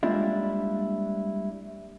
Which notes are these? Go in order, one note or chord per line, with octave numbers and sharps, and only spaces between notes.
G3 G#3 A#3 D4 E4 F4